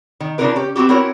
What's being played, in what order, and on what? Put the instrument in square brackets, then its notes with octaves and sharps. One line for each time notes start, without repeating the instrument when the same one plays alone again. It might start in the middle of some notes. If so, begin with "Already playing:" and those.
[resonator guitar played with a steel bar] D#3
C#3 D4 D#4 F4 A#4 B4
C#4 G4
B3 C4 D#4 F#4 G4
C4 E4 F#4 A#4 C#5